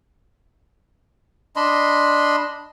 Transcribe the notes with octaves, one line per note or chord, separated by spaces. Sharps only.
D4 D#5 B5 C6